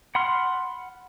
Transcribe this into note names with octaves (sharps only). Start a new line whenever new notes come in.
F#5 B5 C6 F6